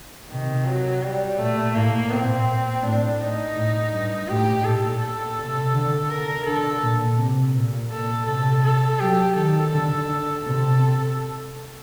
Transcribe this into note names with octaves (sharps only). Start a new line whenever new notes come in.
C3 D#3
F#3
G3
A#2 A3
A2 A#3
A#2 C4
A2 D4
D#4
A2
G2
A2 G4
A#2 A4
A4
C3
D3
A#4
D3 A4
A#2
C3
A#2
A4
C3 A4
A4
F#3 G4
D#3 A4
D3
C3 A4